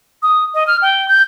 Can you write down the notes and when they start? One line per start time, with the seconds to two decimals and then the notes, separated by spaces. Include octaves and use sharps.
0.22 D#6
0.54 D#5
0.67 F6
0.82 G5
1.08 G6